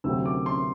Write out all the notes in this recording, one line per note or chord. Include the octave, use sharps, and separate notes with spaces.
D2 C3 F#3 C4 E6
D6
C6